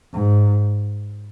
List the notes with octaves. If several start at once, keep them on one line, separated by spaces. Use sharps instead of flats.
G#2